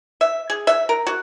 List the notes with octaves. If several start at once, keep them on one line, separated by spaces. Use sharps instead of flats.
E5
G#4
E5
A#4
F#4